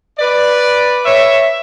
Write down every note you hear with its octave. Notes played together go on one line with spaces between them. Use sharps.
B4 D5
C#5 E5